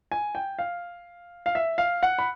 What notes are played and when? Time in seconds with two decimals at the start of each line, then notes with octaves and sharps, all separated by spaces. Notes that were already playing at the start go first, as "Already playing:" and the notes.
0.12 G#5
0.35 G5
0.59 F5
1.46 F5
1.55 E5
1.78 F5
2.03 F#5
2.18 B5